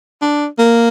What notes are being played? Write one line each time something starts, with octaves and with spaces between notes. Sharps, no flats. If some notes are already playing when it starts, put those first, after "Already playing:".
D4
A#3